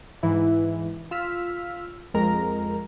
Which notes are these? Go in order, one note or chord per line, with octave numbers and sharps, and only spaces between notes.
G#2 E3 E4
F4 E6 F6 B6
F2 G#3 A#4 A#5